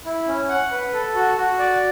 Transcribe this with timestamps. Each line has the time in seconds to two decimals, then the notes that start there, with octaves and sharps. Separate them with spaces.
0.05 E4
0.27 C#4
0.49 F#5
0.71 B4
0.93 A4
1.15 F#4
1.37 F#4
1.59 D5